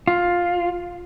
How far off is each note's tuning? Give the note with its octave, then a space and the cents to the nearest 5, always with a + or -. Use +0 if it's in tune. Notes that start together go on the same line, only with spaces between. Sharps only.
F4 +10